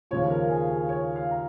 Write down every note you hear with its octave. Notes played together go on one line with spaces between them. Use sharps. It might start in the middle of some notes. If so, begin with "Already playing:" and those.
D#2 C#3 F3 C#5
A#4
G#4
G#4
C#5
F5
A#5